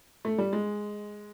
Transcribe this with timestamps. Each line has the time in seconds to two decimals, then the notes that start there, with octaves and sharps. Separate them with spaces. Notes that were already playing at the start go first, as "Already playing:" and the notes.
0.25 A3
0.38 G3
0.53 G#3